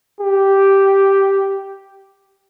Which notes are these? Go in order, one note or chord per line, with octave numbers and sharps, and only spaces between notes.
G4